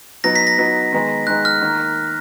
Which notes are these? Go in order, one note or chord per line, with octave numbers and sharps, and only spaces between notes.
F#3 B3 D#4 A#6
B6
A#6
F#3 B3 D#4
D#3 G#3 B3 D#4
D#3 G#3 B3 D#4 F#6
F6
D#3 A#3